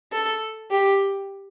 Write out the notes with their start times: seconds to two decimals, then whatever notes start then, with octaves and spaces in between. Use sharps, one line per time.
0.12 A4
0.71 G4